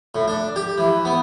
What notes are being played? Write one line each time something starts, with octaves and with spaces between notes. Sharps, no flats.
A2
D4
G4
E3
B3